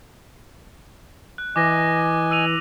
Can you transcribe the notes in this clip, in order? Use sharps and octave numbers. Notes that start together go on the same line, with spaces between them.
F#6
E3 D#5 G#5 D6 A#6
E6 D#7 F7